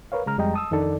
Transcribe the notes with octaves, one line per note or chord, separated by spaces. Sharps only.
A#4 B4 C#5 F5
C#3 G#3 A#5 F6
F2 G3 G#3 D#5 G5 A#5
A5 D#6 E6
F2 D#3 D4 D#4 A4 D5